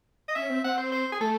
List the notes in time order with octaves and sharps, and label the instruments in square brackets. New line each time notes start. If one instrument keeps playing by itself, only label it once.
[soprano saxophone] D#5
[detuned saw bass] C#4 [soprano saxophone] E5
[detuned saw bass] C4
[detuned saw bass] C4 [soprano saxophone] F#5
[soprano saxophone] C5
C5
G#4
[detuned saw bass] A3 [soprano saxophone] A4